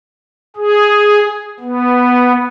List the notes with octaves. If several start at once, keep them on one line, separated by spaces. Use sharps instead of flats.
G#4
B3